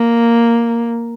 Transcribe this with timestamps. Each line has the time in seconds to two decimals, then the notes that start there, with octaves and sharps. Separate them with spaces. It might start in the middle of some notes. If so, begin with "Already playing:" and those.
Already playing: A#3